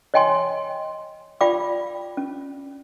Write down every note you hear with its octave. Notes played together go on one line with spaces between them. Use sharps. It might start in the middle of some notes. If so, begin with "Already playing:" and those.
C#5 D#5 G5 G#5 C6
F4 D5 F5 G5 B5 D6
C#4